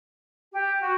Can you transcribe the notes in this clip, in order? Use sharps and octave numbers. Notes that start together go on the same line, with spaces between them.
G4
F#4